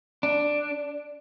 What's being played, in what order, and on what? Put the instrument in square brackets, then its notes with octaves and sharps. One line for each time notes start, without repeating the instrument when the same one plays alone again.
[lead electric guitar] D4